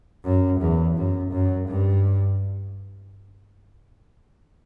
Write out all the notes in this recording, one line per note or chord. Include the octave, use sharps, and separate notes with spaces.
F#2
E2
F#2
F#2
G2